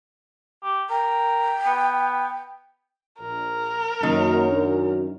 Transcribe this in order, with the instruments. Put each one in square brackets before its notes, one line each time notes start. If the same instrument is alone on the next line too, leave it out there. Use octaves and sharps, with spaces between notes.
[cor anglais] G4
[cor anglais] A#4 [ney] G5
[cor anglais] B3
[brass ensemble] A#1 [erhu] A#4
[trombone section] F#2 [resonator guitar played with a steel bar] D#3 [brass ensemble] A#3
[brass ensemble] D4